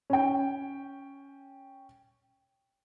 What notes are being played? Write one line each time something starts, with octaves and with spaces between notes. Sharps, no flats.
C#4 G5